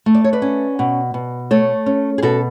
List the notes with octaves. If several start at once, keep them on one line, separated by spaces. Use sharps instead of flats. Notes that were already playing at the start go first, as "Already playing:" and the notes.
A3
D5
C#5
B4 D5
C#4
B2
B2
A3 A4 C#5
C#4
G#4
B2 F#4 A4